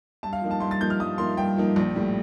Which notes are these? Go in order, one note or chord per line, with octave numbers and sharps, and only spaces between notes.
G2 A5
F5
F3 A#3 D#4
A5
G2 C6
A6
F3 A#3 D#4 G6
F6
G2 D#6
F3 A#3 D#4 C6
G2 G5
F3 A#3 D#4
A#1
A2 G3